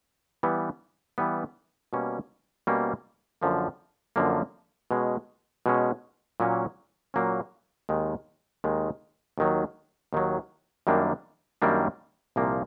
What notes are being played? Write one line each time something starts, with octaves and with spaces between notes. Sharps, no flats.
E3 G3 B3
E3 G3 B3
B2 G3 A#3 C#4
B2 G3 A#3 C#4
F#2 D3 F3 A#3
F#2 D3 F3 A#3
B2 G#3 C#4
B2 G#3 C#4
A#2 F#3 A#3 C#4
A#2 F#3 A#3 C#4
D#2 D#3 G#3
D#2 D#3 G#3
D#2 D#3 F#3
D#2 D#3 F#3
F#2 D#3 G3 A#3 D4
F#2 D#3 G3 A#3 D4
C2 A#2 F3 A#3